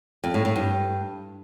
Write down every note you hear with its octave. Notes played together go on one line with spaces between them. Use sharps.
F2
A2
A2
G2